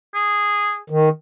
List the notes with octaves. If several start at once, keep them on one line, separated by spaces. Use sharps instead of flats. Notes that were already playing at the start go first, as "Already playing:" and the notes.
G#4
D#3